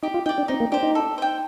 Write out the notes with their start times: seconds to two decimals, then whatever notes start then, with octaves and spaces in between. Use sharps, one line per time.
0.03 D#4 G4
0.14 F4
0.26 D#4 G5
0.29 D5
0.38 D4
0.48 C4 D#4
0.60 A#3
0.72 D4 G4 C5
0.83 D#4
0.95 A4
1.18 C5 G5